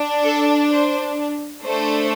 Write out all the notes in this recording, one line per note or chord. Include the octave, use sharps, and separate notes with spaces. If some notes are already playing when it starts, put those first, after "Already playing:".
Already playing: D4
A4
C5
A3 D4 A4 C5